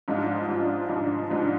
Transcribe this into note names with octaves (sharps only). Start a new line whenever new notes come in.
G#2 F3 G#3 D4 F4
G#2 F3 G#3 D4 F4
G#2 F3 G#3 D4 F4
G#2 F3 G#3 D4 F4